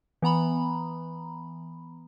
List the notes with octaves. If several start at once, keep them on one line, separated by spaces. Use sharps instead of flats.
E3 B3 A#5 B5